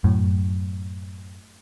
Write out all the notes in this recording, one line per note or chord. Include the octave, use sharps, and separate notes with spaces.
F#2 A2